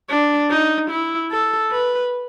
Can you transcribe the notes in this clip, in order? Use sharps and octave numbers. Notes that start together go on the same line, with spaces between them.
D4
D#4
E4
A4
B4